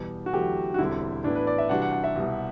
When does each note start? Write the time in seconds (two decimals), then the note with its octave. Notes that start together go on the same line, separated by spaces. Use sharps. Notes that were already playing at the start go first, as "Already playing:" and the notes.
Already playing: E2 B2 G3
0.26 F#4
0.33 E2 D3 F#3 A3 G4
0.74 F#4
0.79 E1 E2 D3 G3 C4 E4
1.24 A2 E3 B3 D4
1.36 B4
1.47 D5
1.58 E5
1.69 C3 E3 G3 D4 F#4 F#5
1.82 F#5
1.92 F#5
2.04 E5
2.15 C2 B2 G3